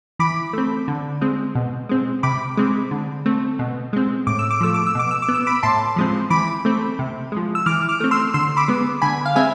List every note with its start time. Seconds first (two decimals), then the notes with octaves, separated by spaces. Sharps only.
0.19 E3 B5 D6
0.53 A3 C4
0.88 D3
1.21 G#3 C4
1.55 B2
1.89 G#3 C4
2.23 C3 B5 D6
2.57 G#3 C4
2.91 D3
3.26 A3 C4
3.59 B2
3.93 G#3 C4
4.27 A2 D6
4.39 E6
4.51 D6
4.61 F3 A3 E6
4.74 D6
4.87 E6
4.95 B2 D6
5.11 E6
5.22 D6
5.28 B3
5.34 E6
5.47 B5 D6
5.63 A2 A5 C6
5.96 F3 G#3 C4
6.30 E3 B5 D6
6.65 A3 C4
6.99 C3
7.32 F3 G#3
7.55 E6
7.66 E3 D6 F6
7.89 D6 F6
8.00 A3 C4
8.11 C6 E6
8.34 D3 C6 E6
8.57 B5 D6
8.68 G#3 B3
9.02 D3 G#5 B5
9.26 F5
9.36 G#3 C4 E5 G#5